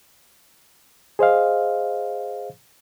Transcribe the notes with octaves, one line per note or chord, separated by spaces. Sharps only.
G#4 C5 D#5 F5